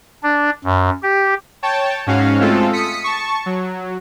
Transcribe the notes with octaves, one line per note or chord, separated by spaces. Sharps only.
D4
F#2
G4
C#5 G5 A5
G#2 C#4 F#4 F5
G#3 A3 C4 F4 A4
D#6 B6 C#7
A5 C#6
F#3